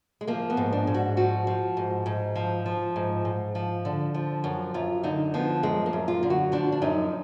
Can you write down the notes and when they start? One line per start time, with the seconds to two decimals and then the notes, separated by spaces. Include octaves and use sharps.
0.21 G#3
0.27 F3 A#3
0.50 B3
0.57 G#2
0.73 D4
0.87 G#2
0.94 F#4
1.17 F3 F#4
1.47 F3
1.77 G#2
2.06 G#2
2.36 F3
2.66 F3
2.96 G#2
3.25 G#2
3.55 F3
3.85 D3
4.14 F3
4.44 F#2
4.74 F#2 F4
5.03 D3 D#4
5.34 F3 B3
5.63 F#2 G#3
5.86 A#3
5.93 F#2
6.08 F4
6.23 D3
6.30 F#4
6.52 F3 D4
6.72 D4
6.82 F#2 D#4